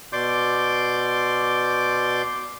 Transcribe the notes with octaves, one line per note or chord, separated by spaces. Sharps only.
B2 D5 C6 D6 G6